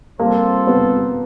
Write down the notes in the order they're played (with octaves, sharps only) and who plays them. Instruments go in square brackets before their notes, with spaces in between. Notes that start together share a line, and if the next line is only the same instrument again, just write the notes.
[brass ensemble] G3 C4 F4 A4 C5 [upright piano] A#3
[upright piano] B3